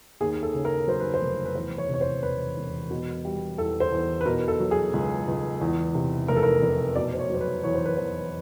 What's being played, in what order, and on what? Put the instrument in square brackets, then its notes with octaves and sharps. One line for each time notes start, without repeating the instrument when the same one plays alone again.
[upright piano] D#2 G#4
A4
C#3
A#4
F#3 C5
B4
C5
F1
B4
E2 C5
C#5
C3 C#5
C5
E1 B4
E1
B2
G3
E2 A4
C5
E2
B4
B2 A#4
A4
F#3
G#4
C#2
C#2
E2
C3
F1 A#4
A4
A#4
F1
B2 D5
C5
C#5
F#3 C5
B4
E2 C#5
C5
B4
E2 C5